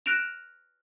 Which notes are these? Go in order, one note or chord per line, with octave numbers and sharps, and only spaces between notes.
F6 F#6 A#6 D7 E7 F7